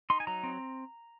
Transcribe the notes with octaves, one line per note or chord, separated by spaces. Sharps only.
D#4 C6
G#5
F#3 A#5
C4